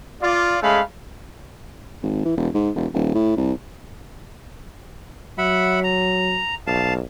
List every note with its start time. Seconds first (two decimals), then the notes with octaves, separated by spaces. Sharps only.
0.21 F4 D5
0.62 G#3 A3 C#4 F5 B5
2.02 G#1
2.25 E3
2.37 E1
2.54 G#2
2.75 E1
2.93 D#1
3.14 A2
3.37 C2
5.38 F#3 E5 F#5 B5
5.84 A#5
6.67 B1 F5 A5